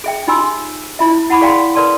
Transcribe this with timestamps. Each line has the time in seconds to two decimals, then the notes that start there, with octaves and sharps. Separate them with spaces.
0.04 G#4 E5 G5
0.27 D#4 F4 G4 G#5 C6 E6
0.99 E4 F4 E5
1.29 E4 F#5 A5 B5 C#6 D6
1.41 G#4 D5 F5 G5 A#5 C6
1.75 A#4 B4 D5 A5 C6